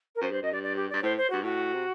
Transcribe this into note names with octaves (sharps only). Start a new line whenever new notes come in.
A#4
F#2 C5
G2 C5
F#2 D#5
G2 D5
D5
G4
G2 D5
A2 C5
C5
G2 F#4
A2 F#4
C3